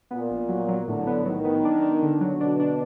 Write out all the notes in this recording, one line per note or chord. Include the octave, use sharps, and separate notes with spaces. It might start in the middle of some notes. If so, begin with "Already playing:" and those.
A#2 B3
A#1
F#3
F#3
A2 D3
B3
D#3 F#3
B3
D4
D4
D3
F#3
B2 D4
D4